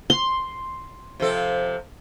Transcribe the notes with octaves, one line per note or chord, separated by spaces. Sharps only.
C6
C3 F3 A4